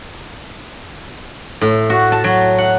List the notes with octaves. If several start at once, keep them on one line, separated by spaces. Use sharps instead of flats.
A2
F#4
A5
F#3
F#5